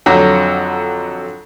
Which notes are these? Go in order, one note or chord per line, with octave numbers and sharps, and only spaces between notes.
F2 D3 F#3